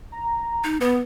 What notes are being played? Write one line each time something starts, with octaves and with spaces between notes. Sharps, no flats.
A#5
D#4
B3 B4